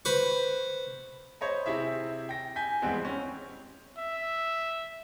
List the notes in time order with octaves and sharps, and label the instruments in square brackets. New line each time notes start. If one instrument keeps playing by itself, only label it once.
[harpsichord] B4 C5 C#6
[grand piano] C5 C#5 D#5 B5
C3 E4 G#4 E5
G5 A#6
G#5 G6 B6
E2 G2 E3 G#3 B3 C4
C4 C#4
[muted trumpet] E5